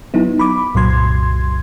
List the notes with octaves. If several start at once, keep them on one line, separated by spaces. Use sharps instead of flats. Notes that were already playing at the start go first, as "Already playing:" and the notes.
F#3 B3 D#4 E4
B5 D6
C2 F#2 A#2 F#3 C6 G#6